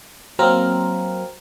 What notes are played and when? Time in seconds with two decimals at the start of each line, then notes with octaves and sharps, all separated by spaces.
0.39 F#3 A#3 C4 A#4